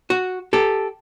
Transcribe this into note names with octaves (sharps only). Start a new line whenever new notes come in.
F#4
G4 A4